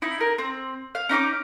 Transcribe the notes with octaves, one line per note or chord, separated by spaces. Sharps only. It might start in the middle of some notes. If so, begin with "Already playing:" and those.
D#4 E4
A#4
C4
F5
C#4 D#4 C#6 D6